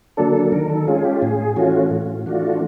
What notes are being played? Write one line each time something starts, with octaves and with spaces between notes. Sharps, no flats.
D3 F#3 A#3 D4 A4
D#3 A#4
A4
G#3 C#4 F4 G#4
G4
A2 G#4
E3 A3 C#4 F4 F#4
A2
E3 A3 D4 F4 F#4